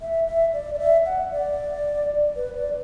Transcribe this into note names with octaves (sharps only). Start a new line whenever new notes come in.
E5
E5
D5
D5
E5
F#5
D5
B4
D5